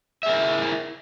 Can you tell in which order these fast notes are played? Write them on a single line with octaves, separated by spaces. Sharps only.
E5 G#4 A#4 E4